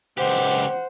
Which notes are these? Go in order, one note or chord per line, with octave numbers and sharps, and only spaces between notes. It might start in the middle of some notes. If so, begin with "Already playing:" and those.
C#2 G4 C5 F#5